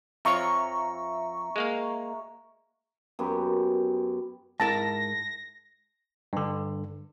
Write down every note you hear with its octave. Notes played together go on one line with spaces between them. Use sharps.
F2 F3 C#5 E5 A#5 C#6
G#3 A#3 F5
F#2 B3 G4
G#2 E4 A#4 A5 A#6
G2 D3